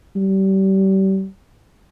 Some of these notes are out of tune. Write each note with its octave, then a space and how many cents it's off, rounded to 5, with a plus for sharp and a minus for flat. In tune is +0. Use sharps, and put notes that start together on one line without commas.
G3 -30